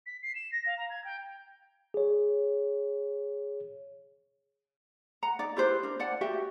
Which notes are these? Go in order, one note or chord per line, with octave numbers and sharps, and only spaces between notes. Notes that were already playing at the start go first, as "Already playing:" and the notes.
B6
C7
E7
A#6
F5
A#5
G#6
G5
G#4 C#5
F#5 A#5
D#4 D5
E4 G4 B4 C5
D4 A#4
C5 D5 F#5 A5
F#4 G4 E5 G5